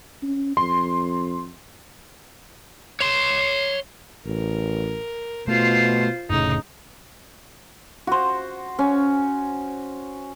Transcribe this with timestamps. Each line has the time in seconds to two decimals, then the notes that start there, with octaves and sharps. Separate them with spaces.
0.23 C#4
0.57 F2 C6
3.00 C#5 C6 C7
4.26 A1 A#4
5.48 B2 A3 F4 C5
6.30 F1 A2 C#3 D#4
8.07 F#4 C5
8.79 C#4